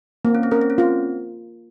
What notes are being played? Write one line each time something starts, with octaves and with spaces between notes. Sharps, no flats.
A#3 C4
C#4
C4
C#4 A#4
C4
C#4
C4 F4